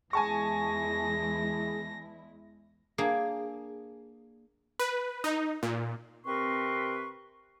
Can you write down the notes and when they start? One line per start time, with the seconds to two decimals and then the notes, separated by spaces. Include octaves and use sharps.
0.13 E2 G#3 E4 G#4 G#5 A5 C#6 A#6
2.98 A#3 D4 G#4
4.79 B4
5.24 D#4
5.63 A#2
6.25 C3 C4 A#4 B4 C6 C#6